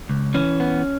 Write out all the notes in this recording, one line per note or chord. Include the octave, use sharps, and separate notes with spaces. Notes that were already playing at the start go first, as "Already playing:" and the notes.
C#2
E3 C#4
B3